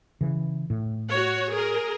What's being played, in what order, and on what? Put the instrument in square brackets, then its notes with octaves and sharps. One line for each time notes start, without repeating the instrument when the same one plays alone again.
[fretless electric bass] C#3 E3
A2
[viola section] F#4 C#5
G#4 A#4